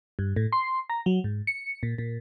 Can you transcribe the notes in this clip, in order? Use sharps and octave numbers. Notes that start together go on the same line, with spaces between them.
G2
A2
C6
A#5
F#3
G#2
C#7
A#2
A#2